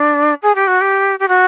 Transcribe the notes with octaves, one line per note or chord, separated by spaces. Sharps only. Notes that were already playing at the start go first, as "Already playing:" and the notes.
Already playing: D4
G#4
G4
F#4
G4
G4
F#4